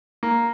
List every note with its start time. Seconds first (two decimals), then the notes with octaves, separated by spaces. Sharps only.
0.23 A#3